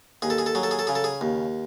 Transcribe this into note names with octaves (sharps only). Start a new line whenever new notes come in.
D#2 G#4
A4
G#4
A4
F#3 G#4
A4
G#4
A4
C#3 G#4
A4
G#4
D#2